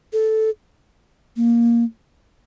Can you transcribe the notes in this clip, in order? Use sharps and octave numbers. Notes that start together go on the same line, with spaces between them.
A4
A#3